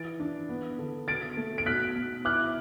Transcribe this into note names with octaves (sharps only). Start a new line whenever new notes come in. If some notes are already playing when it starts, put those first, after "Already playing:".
Already playing: E3 A6 D7
D4
B3
D3
B2 A6 D7
A3
D7
B2 F#6 B6
B2
E4 D6 F#6